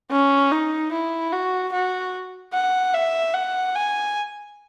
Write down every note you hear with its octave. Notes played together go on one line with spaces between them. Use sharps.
C#4
D#4
E4
F#4
F#4
F#5
E5
F#5
G#5